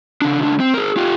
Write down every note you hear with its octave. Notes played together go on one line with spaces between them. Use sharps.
C#3 D4
C#2 D4
C4
G#4 A#4
F4 G4